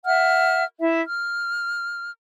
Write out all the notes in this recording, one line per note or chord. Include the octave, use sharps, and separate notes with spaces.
E5 F#5 F6
E4 E5
F6